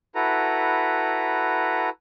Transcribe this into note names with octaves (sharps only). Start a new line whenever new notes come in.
E4 F#4 A4 B4 A#5